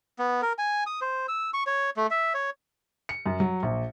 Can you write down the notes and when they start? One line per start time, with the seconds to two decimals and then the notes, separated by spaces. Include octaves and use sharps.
0.19 B3
0.42 A#4
0.59 G#5
0.87 D#6
1.01 C5
1.28 E6
1.54 C#6
1.67 C#5
1.97 A3
2.11 E5
2.34 C#5
3.09 C#7
3.26 F#2
3.40 F#3
3.63 A#1